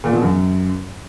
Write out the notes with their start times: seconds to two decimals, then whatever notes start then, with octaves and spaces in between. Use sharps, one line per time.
0.04 A#2
0.13 B2
0.22 F#2